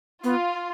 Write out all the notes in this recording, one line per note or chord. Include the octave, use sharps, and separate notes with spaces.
B3 F4